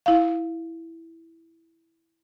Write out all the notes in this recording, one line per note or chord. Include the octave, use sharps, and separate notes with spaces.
E4 F5